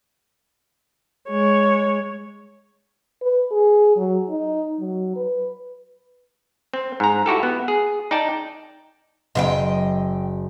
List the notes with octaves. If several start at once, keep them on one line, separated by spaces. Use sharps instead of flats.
G#3 C#5
B4
G#4
F#3
D#4
F#3
B4
C4
G#2 A#5
E4 F#4 G4 A4
B3
G#4
D#4 D5 G5 A5
F#1 D#5 F#5 G5 C6